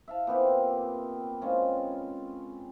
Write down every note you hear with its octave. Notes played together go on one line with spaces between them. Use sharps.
E5 F5 A5
A#2 B3 C4 G4
G#3 C4 C#4 F4